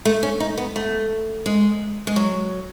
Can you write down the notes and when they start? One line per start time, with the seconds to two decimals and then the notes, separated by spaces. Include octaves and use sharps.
0.05 A3
0.23 C#4
0.40 D#4
0.57 B3
0.76 A3
1.46 G#3
2.07 G#3
2.16 F#3